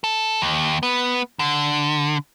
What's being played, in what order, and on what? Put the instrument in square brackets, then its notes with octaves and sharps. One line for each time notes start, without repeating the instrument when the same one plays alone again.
[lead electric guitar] A4
D#2
B3
D3